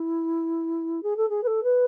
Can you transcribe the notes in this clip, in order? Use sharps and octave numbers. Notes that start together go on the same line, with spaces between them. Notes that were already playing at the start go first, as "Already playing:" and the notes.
Already playing: E4
G#4
A4
G#4
B4
A4
B4